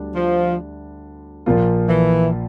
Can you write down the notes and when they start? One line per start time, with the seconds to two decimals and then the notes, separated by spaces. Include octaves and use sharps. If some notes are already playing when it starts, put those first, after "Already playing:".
Already playing: D2 D3 G3 D4
0.14 F3
1.46 A#1 A#2 F3 A#3 F4
1.89 E3